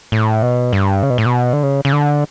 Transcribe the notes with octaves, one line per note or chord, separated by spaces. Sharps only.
A2
B2
G2
C#3
B2
A2
B2
D3
C#3
C#3
D3